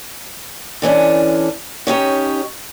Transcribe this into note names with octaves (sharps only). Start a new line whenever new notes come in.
D3 E3 C#4 D4
C#4 D#4 G4 C#5